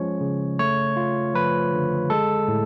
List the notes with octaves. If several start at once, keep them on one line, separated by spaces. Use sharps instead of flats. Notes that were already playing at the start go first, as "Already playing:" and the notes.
Already playing: F3 G#3 C#4 C#5
C#3
A3 C#5
F4
F3 B4
D3
G#3 A4
A2